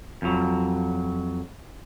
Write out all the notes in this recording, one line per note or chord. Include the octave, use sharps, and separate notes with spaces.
F2 F#3